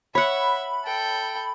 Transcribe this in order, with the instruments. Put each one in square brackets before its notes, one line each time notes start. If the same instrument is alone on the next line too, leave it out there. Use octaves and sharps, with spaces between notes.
[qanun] C#5 F#5 [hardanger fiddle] E5 [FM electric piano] B5
[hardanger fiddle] A4 G5